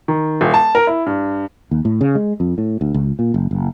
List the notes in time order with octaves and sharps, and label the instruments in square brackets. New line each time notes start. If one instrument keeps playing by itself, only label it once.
[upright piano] D#3
D#1
A5
A#4
E4
G2
[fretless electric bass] D#2
A2
C#3
G#3
F2
A2
D2
C#2
A#2
F#1
F#1